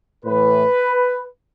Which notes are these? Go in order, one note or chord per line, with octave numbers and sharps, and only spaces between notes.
A2 E3 B4